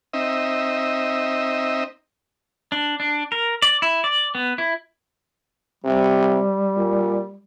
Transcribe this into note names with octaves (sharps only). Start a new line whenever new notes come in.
C4 D#4 D#5 E5
D4
D4
A#4
D5
E4
D5
B3
E4
C3 G3
A#2